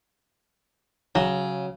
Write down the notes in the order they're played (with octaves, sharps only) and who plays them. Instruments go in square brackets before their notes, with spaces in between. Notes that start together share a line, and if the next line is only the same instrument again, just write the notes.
[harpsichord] C#3 [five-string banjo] F#3